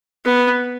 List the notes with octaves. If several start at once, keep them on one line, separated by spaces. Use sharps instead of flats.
B3